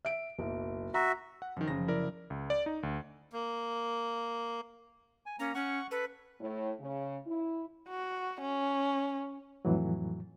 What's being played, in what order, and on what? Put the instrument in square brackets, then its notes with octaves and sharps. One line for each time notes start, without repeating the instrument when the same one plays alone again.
[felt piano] E5 D7
F#1 B1
[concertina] F#4 E5 [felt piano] A#5
[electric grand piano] F#5
[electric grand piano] F#2 D#3 [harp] F3
[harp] F#1 [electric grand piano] C#3 A#6
[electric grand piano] E4 A#4 D5
C#2
D5
D#4
D2
[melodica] A#3
[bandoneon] G#5
[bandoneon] A#3 A#5 [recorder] C#4
[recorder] C#4 [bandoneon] F#5 C#6
[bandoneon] A4 [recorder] B4
[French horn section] A2
C#3
E4
[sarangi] F#4
C#4
[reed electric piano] F2 A2 E3 F#3